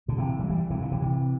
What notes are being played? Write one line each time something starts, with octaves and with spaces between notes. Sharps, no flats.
A#2 D3
C3 E3
E3 G3
E3 G3
C3 E3
A#2 D3
C3 E3
C3 E3